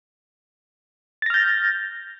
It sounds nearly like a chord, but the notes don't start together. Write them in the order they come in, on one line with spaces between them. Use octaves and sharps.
A6 A#6 F6 G6